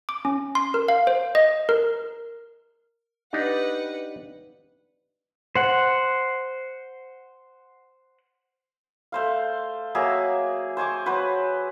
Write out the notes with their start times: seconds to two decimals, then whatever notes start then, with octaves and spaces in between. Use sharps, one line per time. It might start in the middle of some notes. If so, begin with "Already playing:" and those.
0.09 D6
0.25 C#4
0.55 C6
0.74 A#4
0.88 F5
1.07 C5
1.35 D#5
1.69 A#4
3.33 D4 D#4 G4 B4 F#5
5.55 C5 F#5
9.12 A3 C5 F5
9.95 F#3 A#3 G#4 E5
10.77 C5 G#5 C#6 D6
11.06 F#3 F#4 B4 C5